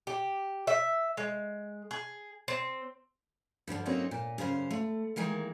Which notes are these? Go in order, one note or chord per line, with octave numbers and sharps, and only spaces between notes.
G4
E5
G#3
G#4
C4
G2 D3 D#3 F3
F#3 A#3 C4 C#4 D#4 F#4
A#2
F#2 C#3 C5 F5
A3
D#3 E3 G#3 A#3